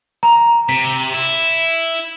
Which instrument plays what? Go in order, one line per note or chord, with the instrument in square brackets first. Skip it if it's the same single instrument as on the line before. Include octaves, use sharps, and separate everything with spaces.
[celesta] A#5
[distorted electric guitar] C3 [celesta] B6
[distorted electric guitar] E4